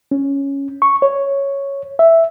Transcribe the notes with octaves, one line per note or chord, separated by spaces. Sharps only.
C#4
C#6
C#5
E5